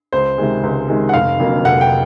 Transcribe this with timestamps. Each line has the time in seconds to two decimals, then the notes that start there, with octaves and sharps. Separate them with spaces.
0.13 C#2 C5
0.38 C3 D#3 G#3
0.63 C#2
0.88 C3 D#3 G#3
1.09 F#5
1.14 F1 F5
1.39 F2 D3 F#3 A#3
1.64 F1 F#5
1.81 G5